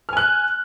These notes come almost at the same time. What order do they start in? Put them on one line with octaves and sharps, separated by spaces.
F6 G#5 F#6